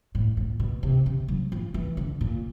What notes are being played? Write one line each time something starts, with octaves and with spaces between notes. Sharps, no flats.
A2
A#2
B2
C3
C#3
F#3
F3
E3
D3
A#2